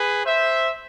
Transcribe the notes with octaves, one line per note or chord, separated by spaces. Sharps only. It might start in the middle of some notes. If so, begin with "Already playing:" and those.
Already playing: G#4 B4
C5 E5